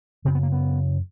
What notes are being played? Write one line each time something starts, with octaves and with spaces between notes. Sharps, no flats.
F#2 C#3 C4
B3
A#3
B3